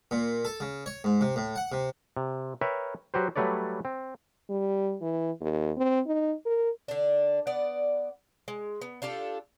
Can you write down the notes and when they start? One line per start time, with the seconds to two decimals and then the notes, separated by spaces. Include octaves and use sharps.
0.11 A#2
0.45 A4
0.60 C#3
0.86 C#5
1.04 G#2
1.21 C3
1.36 A2
1.56 F#5
1.72 C3
2.17 C3
2.61 A#4 B4 C#5 E5 G5
3.14 F#3 F#4 G4 B4 C5
3.36 F#3 G3 A3 B4 C#5 D5
3.85 C4
4.50 G3
5.02 E3
5.41 D#2
5.77 C4
6.07 D#4
6.46 A#4
6.88 D3 D4
7.47 B3 D5 F#5
8.48 G#3
8.81 B3
9.02 D4 F4 G4 A4